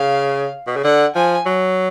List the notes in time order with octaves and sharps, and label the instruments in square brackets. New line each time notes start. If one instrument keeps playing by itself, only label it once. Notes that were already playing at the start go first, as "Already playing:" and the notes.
Already playing: [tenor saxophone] C#3 [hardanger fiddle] F5
[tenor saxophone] B2
C#3
[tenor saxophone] D3 [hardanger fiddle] F#5
[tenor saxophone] F3 [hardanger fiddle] G#5
[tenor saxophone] F#3